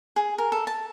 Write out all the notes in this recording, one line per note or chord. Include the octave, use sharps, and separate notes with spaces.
G#4
A#4
A4
A5